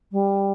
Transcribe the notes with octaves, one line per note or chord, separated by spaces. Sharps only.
G3